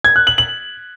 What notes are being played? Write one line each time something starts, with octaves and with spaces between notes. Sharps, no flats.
G#6
F#6
F#7
F#7